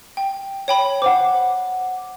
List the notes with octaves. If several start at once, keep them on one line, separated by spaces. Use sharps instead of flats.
G5
C#5 G5 B5
C5 F#5 D6